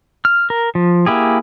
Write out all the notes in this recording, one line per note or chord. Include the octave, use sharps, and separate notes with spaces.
F6
A#4
F3
A#3 E4 G4 G#4